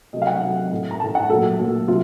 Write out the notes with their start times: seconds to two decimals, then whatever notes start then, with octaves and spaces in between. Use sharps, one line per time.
0.13 C3 F#3 A3 D#5
0.22 F5
0.27 F#5
0.42 C3 F#3 A3
0.72 A2 A3
0.91 A#5
1.00 A2 A3 A5
1.15 F#5
1.30 A#2 F#3 A3 A4
1.59 A#2 F#3 A3
1.88 C3 F#3 F4